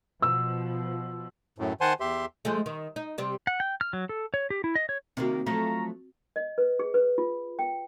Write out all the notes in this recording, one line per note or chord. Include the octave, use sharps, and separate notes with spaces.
B2 F3 E6
F#2 A2
D#3 C5 F#5 G#5 A5 C6
E2 G4 E5 C6
F3 G#3 A3
D#3
D#4
C3 G3 C4
F#5
G5
F6
F#3
A4
C#5
G4
E4
D#5
C#5
C3 D#3 A#3 C4 F#4
F3 F#3 A3 A#5
D#5
B4
G#4
B4
F4
G5